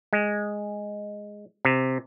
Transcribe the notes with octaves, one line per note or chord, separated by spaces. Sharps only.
G#3
C3